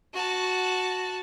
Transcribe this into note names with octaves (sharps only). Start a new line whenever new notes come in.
F#4 A5